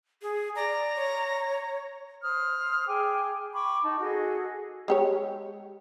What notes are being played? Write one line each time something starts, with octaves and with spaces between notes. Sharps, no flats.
G#4
D5 A#5
C#5
C5 D#6 F6
G#4 G5 G#5 D6
G5 B5 C#6 D6
D#4 A5
F#4 G#4 A4 D#5
G#3 G4 C#5